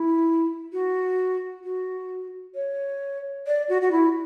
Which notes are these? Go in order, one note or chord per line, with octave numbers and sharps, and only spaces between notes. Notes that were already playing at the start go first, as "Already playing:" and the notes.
Already playing: E4
F#4
F#4
C#5
D5
F#4
F#4
E4